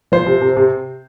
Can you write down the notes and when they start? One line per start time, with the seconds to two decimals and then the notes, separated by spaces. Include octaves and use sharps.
0.12 F3 C5
0.27 C3
0.42 C3
0.57 C3